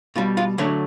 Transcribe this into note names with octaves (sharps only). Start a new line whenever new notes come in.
B2 G3 F4
F4
D3 F#3 A3 C#4